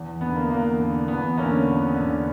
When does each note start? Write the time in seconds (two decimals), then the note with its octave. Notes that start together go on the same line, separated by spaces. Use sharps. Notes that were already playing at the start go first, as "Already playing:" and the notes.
Already playing: E2
0.21 D3 B3
0.35 A#3
0.50 E2 A#3
0.79 D3
1.08 E2 B3
1.37 D3 A#3 C#4
1.66 E2
1.96 D3